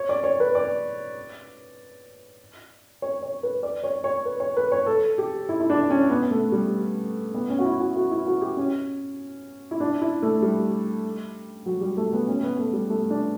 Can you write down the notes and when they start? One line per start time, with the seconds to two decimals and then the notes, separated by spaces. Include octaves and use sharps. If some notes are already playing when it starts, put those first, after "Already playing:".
Already playing: C#5
0.09 D5
0.24 C#5
0.40 B4
0.55 D5
3.02 C#5
3.23 C#5
3.43 B4
3.63 D5
3.84 C#5
4.04 C#5
4.25 B4
4.40 C#5
4.57 B4
4.72 C#5
4.86 A4
5.18 G4
5.49 E4
5.60 E4
5.70 D4
5.90 C#4
6.10 B3
6.31 A3
6.52 G3
7.34 B3
7.49 C#4
7.59 F#4
7.65 E4
7.80 F#4
7.96 F#4
8.11 E4
8.27 F#4
8.41 G4
8.57 C#4
9.71 E4
9.80 D4
10.01 E4
10.22 A3
10.42 G3
11.66 F#3
11.81 G3
11.97 A3
12.13 B3
12.28 C#4
12.43 B3
12.59 A3
12.73 G3
12.89 A3
13.10 D4